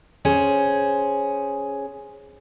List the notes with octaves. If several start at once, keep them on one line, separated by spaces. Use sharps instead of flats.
C#4 G#4 C5